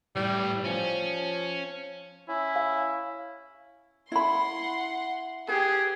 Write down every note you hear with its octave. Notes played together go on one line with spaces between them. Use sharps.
A2 E3 G3
F3 C#4
C#4 E4
F5
E4 F#5 B5 C6
G4 G#4 B4